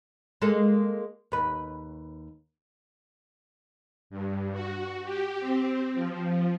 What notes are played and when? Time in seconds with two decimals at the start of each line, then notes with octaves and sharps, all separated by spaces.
0.42 G#3 A#3 A4
1.32 D#2 B4
4.10 G2
4.52 F#4
5.04 G4
5.40 C4
5.94 F3